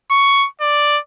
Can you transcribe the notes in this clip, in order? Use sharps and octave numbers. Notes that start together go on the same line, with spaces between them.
C#6
D5